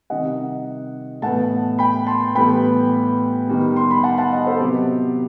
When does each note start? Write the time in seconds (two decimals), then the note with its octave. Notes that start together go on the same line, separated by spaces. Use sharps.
0.10 C3 D#3 G3 D#5 F#5
1.22 A2 E3 B3 F#5 A5
1.79 G5 B5
2.07 A5 C6
2.35 A2 E3 G3 B3 G5 B5
3.48 D#3 G3 B3
3.76 C6
3.91 B5
4.03 F#5 A5
4.18 F#5 A5
4.32 D#5 F#5
4.46 A4 C5
4.60 C3 F#3 B3 G4